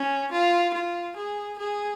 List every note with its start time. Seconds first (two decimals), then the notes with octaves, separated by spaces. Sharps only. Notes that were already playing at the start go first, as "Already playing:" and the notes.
Already playing: C#4
0.32 F4
0.74 F4
1.16 G#4
1.58 G#4